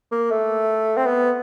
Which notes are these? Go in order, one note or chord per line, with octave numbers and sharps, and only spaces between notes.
A#3
A3
C4
B3